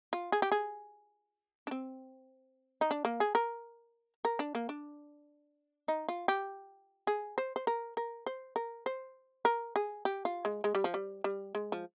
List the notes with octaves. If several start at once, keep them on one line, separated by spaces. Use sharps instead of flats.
F4
G#4
G4
G#4
D4
C4
D#4
D4
A#3
G#4
A#4
A#4
D4
A#3
D4
D#4
F4
G4
G#4
C5
C5
A#4
A#4
C5
A#4
C5
A#4
G#4
G4
F4
G#3
G#3
G3
F3
G3
G3
G#3
F3